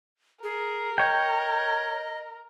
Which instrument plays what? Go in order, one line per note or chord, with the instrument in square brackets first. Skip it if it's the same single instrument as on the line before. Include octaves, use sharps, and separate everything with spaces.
[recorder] G#4 [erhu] A#4
[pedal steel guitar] C#5 G5 [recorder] D#5